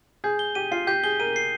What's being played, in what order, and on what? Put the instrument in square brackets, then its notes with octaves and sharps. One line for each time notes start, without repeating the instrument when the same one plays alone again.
[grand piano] G#4 [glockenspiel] G6
[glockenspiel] G7
[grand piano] G4 [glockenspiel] D#7
[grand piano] F4 [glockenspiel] C7
[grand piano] G4 [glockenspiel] G6
[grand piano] G#4 [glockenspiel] G7
[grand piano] A#4 [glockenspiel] D#7
[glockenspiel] C7